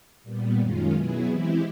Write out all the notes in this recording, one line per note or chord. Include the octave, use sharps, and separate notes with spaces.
A#2 G3 B3
F#2 D#3 G#3 C#4 F4
B2 F#3 B3 E4 G#4
E3 G#3 C4 E4 G4